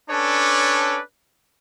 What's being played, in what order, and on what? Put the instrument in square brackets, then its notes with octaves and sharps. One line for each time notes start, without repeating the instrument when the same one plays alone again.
[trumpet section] C#4 D4 A4 B4 C#5 D5